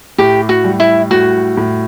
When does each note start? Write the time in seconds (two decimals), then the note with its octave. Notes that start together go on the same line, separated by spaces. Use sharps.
0.18 A2 G4
0.49 F#4
0.64 G3
0.80 E4
1.11 A2 F#4
1.57 A2